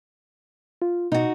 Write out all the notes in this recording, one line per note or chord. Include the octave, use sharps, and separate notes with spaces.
F4
B2 D#4 F#4